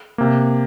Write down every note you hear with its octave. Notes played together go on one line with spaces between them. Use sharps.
C3 A#3